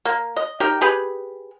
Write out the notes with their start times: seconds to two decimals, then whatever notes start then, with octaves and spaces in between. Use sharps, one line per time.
0.05 A#3
0.36 D#5
0.60 D#4 G4 A#4 G5
0.81 G4 G#4 B4